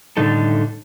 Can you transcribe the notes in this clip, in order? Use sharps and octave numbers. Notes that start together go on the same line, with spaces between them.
A2 D3 D#3 G3 D#4 A4